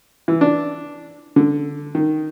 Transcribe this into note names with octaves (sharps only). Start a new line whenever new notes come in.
E3
D4
D3
D#3